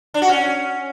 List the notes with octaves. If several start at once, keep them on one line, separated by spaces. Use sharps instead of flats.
D4
F#4
C#4